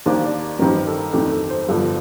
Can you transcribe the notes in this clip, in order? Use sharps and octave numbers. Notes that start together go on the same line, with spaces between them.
D#2 D#3 A#3 D4 C5
D5
A1 G2 D#3 G3 C4 A#4
A4
F2 D#3 A3 D4 G4
A4
C5
G1 G2 D3 F3